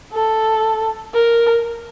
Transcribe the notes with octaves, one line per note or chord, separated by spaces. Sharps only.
A4
A#4